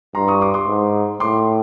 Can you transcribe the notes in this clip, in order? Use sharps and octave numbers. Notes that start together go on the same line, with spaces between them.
G2 A#5 C6
C#6 D#6
C6 D6
C6 D6
G#2
A2 C6 D6